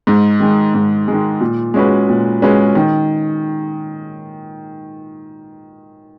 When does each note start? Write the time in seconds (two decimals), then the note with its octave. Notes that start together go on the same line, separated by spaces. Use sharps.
0.07 G#2
0.40 D#3 G#3
0.74 G#2
1.08 D#3 G#3
1.41 A#2
1.74 G#3 C#4 F#4 B4
2.09 A#2
2.42 G#3 C#4 F#4 B4
2.75 D#3